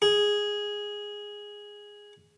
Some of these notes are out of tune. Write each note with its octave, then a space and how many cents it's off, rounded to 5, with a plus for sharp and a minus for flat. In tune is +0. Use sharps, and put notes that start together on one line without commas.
G#4 -5